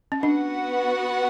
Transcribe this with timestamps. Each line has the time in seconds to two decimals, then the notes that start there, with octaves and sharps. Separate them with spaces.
0.12 C#4
0.23 B3 D4 F#4 B4 F#5